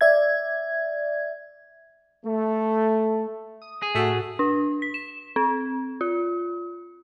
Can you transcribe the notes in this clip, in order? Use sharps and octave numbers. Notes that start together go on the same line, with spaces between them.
D5 E5 G#6
A3
D#6
G#4
A2 A3 F#4
D4
B6
E7
C4
F4